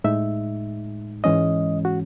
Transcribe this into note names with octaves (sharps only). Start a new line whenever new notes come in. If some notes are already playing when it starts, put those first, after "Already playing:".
A2 G#3 D#4 E5
G#2 E3 G#3 C#4 D#5
F#4